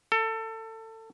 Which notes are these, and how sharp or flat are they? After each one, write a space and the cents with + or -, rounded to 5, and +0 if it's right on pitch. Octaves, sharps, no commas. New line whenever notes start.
A4 +25